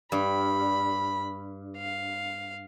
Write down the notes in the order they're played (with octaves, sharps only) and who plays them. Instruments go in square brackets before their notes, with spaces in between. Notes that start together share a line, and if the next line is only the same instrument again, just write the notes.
[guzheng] G2 [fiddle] B5
[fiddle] F5